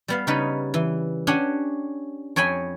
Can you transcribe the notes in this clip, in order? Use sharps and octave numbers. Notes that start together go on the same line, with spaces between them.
G3 B3 F5
C#3 G3 D#4 B4 C#5 B5
E3
C#4 D4 G4 C#5 F#5 G#5
F2 C#5 G5 G#5 B5